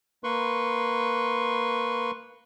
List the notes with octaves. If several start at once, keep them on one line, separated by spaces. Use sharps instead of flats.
A#3 B4 C6 C#6